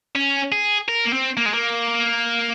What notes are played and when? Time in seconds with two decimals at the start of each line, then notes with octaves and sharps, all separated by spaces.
0.16 C#4
0.52 G#4
0.88 A#4
1.05 A#3
1.13 C4
1.37 A#3
1.46 G#3
1.54 A#3